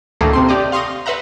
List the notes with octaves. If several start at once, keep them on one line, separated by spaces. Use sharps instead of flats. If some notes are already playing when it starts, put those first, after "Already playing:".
D2 A2 D#3 A3 A#3
C3 C4 C6
G4 D5 D#5
F5 C6 C#6 D#6 A#6
B4 C5 E5 F#5 A#5